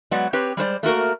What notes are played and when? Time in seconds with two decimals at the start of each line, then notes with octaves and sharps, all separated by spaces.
0.11 F#3 G#3 B3 D5 F#5
0.33 C4 G4 B4 C#5
0.57 G3 G#3 C5 D5
0.83 A3 A#3 F#4 A#4